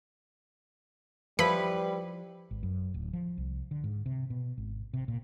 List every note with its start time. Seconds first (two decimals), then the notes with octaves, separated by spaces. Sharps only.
1.39 F3 G3 E4 B4 B5
2.51 G#1
2.63 F#2
2.94 D1
3.13 F3
3.38 C2
3.71 D3
3.84 G#2
4.06 C3
4.30 B2
4.58 G#1
4.94 C3
5.08 A#2